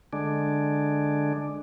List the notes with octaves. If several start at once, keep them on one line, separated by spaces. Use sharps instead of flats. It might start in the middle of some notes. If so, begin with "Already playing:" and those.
D3 G#3 D4